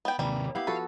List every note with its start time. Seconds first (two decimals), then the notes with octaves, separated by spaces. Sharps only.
0.05 B3 G5
0.19 D#2 C3 E3 G3 A#3
0.55 B3 E4 G4 F5
0.67 F3 F#4 A4 B4